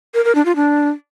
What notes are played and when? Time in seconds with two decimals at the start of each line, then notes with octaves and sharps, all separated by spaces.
0.14 A#4
0.25 A#4
0.35 D4
0.45 F4
0.56 D4